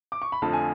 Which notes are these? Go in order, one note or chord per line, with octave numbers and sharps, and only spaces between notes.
D6
C#6
B5
F2 D3 F3 A3 A5
G#5